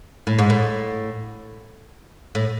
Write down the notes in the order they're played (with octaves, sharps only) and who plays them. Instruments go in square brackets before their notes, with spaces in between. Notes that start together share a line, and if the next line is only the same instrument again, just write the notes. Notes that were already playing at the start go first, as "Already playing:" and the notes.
[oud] A2
G#2
A2
A2